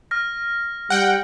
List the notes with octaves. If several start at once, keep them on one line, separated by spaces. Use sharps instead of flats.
F6 A#6
G3 F#5 G5